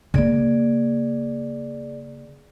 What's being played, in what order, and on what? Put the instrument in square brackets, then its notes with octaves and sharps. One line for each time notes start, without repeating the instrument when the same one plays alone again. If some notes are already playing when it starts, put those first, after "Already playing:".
[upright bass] C#3 A#3 [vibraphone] G#4 D5